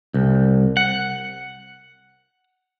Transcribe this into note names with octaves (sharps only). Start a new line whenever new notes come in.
C2
F#5